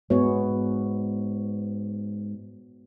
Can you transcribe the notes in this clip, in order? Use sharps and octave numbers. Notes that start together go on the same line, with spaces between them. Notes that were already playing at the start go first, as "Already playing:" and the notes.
G#2 B3 F#4 C#5